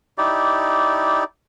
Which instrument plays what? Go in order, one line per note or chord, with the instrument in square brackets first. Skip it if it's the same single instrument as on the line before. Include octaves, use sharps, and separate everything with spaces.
[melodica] D#4 E4 G4 D5